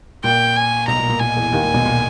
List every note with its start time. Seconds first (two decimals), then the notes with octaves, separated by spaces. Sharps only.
0.24 A#2 G5
0.56 G#5
0.88 B1 B2 A#5
0.99 A#2
1.09 A#2
1.20 A#2 G#5
1.37 E2 E3
1.53 D#2 D#3
1.64 A#2
1.74 B1 B2
1.85 A#2